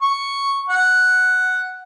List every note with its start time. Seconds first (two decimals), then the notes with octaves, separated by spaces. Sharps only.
0.02 C#6
0.69 F#5